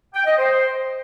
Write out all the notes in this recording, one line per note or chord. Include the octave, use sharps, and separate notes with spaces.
G5
D#5
C5